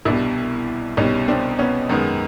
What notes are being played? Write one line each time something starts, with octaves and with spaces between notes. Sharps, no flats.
C2 B2 G3 D4 E4
C2 B2 G3 C#4 D#4
C4 D4
B3 C#4
F#2 D#3 G#3 B3